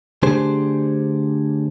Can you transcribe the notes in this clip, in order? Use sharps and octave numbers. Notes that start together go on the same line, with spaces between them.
D3 A3 D4 G4 G#4 C5